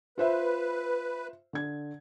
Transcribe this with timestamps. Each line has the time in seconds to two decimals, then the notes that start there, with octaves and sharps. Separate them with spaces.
0.18 F4 B4 C5 E5
1.53 D3 G#6